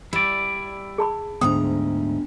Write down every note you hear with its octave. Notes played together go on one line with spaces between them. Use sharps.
G3 E4 D5
G#4 A5 B5
D2 G#2 B3 D4 C5 G5 A#5 D#6